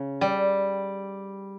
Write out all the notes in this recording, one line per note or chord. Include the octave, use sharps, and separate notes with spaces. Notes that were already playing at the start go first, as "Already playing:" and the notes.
Already playing: C#3
G3